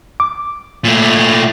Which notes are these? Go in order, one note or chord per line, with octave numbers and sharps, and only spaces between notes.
D6
A#2 A3